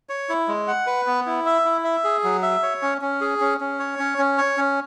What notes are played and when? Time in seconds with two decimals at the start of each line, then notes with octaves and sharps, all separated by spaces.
0.09 C#5
0.29 E4
0.48 G#3
0.68 F#5
0.87 B4
1.07 B3
1.26 E4
1.46 E5
1.65 E4
1.84 E5
2.04 G#4
2.24 F#3
2.43 E5
2.63 C#5
2.82 C#4
3.01 C#4
3.21 G#4
3.40 C#4
3.60 C#4
3.79 C#5
3.99 C#4
4.18 C#4
4.38 C#5
4.57 C#4